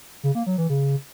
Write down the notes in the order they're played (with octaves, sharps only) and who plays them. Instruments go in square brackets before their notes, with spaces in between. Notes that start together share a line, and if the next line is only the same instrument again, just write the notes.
[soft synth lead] C#3
A#3
F#3
E3
C#3